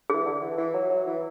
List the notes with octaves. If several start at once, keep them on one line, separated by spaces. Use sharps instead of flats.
E3 G#4
D3
E3
E3
F#3
F#3
E3